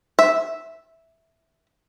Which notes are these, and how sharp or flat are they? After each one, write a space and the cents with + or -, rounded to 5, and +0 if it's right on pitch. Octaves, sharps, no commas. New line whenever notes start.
E5 -5